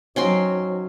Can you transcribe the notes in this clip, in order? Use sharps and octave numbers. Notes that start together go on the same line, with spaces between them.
F#3 C#4 D#4 F#4 C5 G5 C6